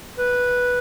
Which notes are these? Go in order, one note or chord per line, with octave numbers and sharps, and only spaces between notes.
B4